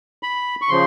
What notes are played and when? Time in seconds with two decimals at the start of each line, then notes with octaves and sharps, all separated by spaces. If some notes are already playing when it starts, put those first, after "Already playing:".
0.23 B5
0.62 C#6
0.69 C#3 F3 C6